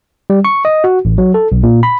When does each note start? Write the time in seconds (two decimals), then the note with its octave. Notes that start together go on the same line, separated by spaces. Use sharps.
0.30 G3
0.45 C#6
0.65 D#5
0.84 F#4
1.05 A1
1.18 F#3
1.34 A4
1.52 B1
1.63 A#2
1.83 B5